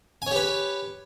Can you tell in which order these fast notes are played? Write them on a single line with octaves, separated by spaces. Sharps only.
G#5 C#5 G4 B4